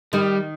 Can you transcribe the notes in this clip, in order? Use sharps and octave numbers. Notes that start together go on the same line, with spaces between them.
D#3 G3